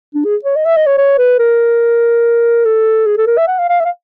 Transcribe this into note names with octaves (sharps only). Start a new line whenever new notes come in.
D4
G#4
C#5
D#5
E5
D#5
C#5
C#5
B4
A#4
A4
G#4
A4
A#4
E5
F#5
F5
F5
E5
F5